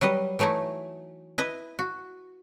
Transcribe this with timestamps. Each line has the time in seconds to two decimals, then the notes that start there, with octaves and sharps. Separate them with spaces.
0.01 F#3 G3 B4 D#5
0.39 E3 F#3 A3 D#4 E4
1.38 E4 B4 D#5
1.79 F#4